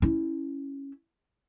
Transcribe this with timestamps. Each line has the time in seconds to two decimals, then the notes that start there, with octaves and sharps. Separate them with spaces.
0.02 C#4 E4